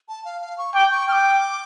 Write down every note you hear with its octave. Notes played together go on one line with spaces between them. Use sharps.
A5
F5
F5
C#6
G5 D6
C#6
G5 D6 F6